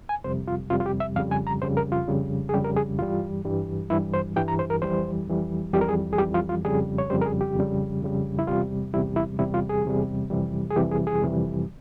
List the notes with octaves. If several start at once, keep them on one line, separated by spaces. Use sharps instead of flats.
G#5
F2 C3 G3 C5
F4
F2 C3 G3 F4
F4
G4
E5
F2 C#3 G3 F5
G#5
A#5
F2 C#3 G3 C5
A#4
F4
F2 C#3 G3
G#4
F2 C#3 G3 G4
A#4
G#4
G2 E3 G3 F4
G2 E3 G3
G2 E3 G3 E4
C5
G2 E3 G3 G5
A#5
C5
A#4
F2 E3 G3 C5
F2 E3 G3
F2 E3 G3 G4
A#4
G#4
G#4
F2 E3 G3 G4
F4
F4
F2 C#3 G3 G#4
C#5
F2 C#3 G3 C5
A#4
G#4
G4
F2 C#3 G3
F2 C#3 G3
E4
E2 C3 G3 F4
E2 C3 G3 E4
E4
E2 C3 G3 E4
F4
G#4
E2 C3 G3
F2 C3 E3 G3
G#4
F2 C3 E3 G3 G4
G#4
G#4
F2 C3 E3 G3